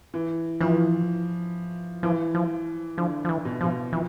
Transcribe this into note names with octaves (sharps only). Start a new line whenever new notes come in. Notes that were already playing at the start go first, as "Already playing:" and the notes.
E3
E3 F3
E3 F3
F3
D3 F3
F3
E3
B2
B2 F3
E3 F3